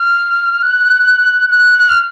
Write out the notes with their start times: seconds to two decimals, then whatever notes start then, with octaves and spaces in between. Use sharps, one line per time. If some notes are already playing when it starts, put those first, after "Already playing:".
Already playing: F6
0.63 F#6
1.49 F#6
1.78 F#6
1.89 F6